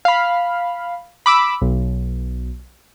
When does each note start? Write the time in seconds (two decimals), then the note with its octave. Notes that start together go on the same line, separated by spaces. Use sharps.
0.05 F5 B5
1.26 B5 D6 E6
1.61 B1